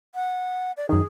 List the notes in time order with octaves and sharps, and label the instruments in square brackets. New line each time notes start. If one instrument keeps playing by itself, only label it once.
[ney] F#5
D5
[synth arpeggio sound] F#2 D#3 [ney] G#4